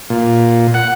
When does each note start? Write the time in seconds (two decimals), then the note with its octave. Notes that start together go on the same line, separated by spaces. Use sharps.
0.10 A#2
0.74 F#5